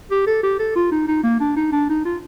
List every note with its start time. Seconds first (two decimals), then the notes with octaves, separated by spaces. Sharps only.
0.11 G4
0.26 A4
0.43 G4
0.59 A4
0.76 F4
0.92 D#4
1.08 D#4
1.23 A#3
1.40 D4
1.56 D#4
1.72 D4
1.89 D#4
2.05 F4